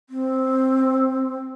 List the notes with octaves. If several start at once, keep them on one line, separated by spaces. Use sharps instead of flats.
C4